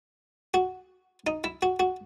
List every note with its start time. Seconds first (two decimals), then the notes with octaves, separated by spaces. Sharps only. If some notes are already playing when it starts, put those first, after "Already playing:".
0.54 F#4
1.27 D#4
1.44 E4
1.62 F#4
1.80 F#4